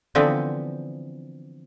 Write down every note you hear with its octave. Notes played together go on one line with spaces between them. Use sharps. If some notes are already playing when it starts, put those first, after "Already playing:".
D3 E3 F3 B3 C4